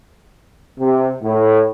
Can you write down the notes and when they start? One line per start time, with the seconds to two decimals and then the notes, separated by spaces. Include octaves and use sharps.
0.80 C3
1.22 A2